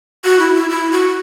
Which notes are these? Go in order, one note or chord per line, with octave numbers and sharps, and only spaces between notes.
F#4
E4
E4
E4
F#4